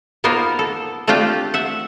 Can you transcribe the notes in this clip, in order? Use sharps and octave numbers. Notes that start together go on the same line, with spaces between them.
A#3 B3 D#4 F4 A#4 C5
A4
A3 C4 D4 F4 G4 G5
E5 F#5